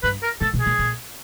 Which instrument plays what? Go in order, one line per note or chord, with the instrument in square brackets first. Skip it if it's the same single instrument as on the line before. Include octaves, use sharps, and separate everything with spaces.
[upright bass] G2 [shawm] B4
[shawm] A#4
[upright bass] A2 [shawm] A4
[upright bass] B2
[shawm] G#4
[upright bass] A#2
A#2